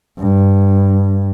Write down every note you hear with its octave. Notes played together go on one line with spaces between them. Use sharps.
G2